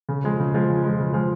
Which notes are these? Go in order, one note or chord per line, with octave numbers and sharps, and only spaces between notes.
C#3
F3 G#3
C#3
F3 G#3
C#3
F3 G#3
C#3
F3 G#3